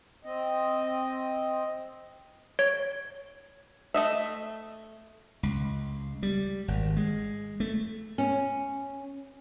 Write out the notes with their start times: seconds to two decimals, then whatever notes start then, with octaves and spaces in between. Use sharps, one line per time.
0.25 C4 D#5
2.59 C#5
3.94 A3 D#5 E5
5.43 C#2
6.23 G3
6.68 G#1
6.97 G#3
7.60 A3
8.18 C#4